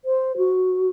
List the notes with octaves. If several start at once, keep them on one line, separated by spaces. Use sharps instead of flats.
C5
F#4